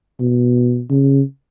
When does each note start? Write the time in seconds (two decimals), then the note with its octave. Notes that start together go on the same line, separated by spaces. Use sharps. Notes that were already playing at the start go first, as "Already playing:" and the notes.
0.20 B2
0.90 C#3